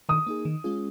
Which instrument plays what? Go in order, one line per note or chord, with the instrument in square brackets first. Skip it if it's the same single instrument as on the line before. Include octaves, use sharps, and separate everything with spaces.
[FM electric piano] D#3 [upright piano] D#6
[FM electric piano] A#3 D#4 G#4
D#3
G#3 C#4 F4 G#4